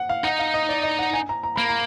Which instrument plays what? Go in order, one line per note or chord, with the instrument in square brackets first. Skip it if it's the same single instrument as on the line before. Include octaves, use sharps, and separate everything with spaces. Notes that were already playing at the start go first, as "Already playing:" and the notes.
Already playing: [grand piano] F#5
F5
[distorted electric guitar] D#4 [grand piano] F#5
[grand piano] F5
D#5
D5
D#5
F#5
G#5
A#5
A#5
[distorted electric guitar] A#3 [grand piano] B5
[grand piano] A#5